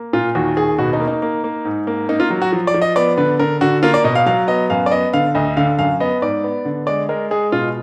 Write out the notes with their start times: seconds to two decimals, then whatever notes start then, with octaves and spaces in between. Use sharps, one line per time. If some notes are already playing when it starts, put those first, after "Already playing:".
Already playing: A#3
0.13 A#2 F4
0.35 D#2 F#4
0.57 D#2 G#4
0.78 B2 F#4
0.93 D#4
1.00 A#3
1.08 D#4
1.22 A#3
1.44 A#3
1.65 G#2
1.87 A#3
2.09 A#3 D#4
2.20 F4
2.30 F#3
2.42 F#4
2.52 F3
2.67 D5
2.74 F3
2.82 D#5
2.96 B3 D5
3.17 D3 B4
3.39 D3 A#4
3.61 D3 F#4
3.83 A#3 F4
3.94 D5
4.04 B2 D#5
4.15 F5
4.26 F#3 F5
4.48 B3 D#5
4.70 F#2 F5
4.86 D5
4.91 B3 D#5
5.13 D3 F5
5.35 D2 D#5
5.57 D3 F5
5.79 F#2 F5
6.00 B3 D#5
6.22 G#2 D5
6.44 B3
6.65 D3
6.87 G#3 D5
7.09 G#3 A#4
7.31 G#3 G#4
7.52 B2 F4